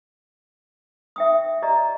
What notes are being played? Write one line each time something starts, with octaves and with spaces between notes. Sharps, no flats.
E5 G5 D#6
G4 D5 D#5 A#5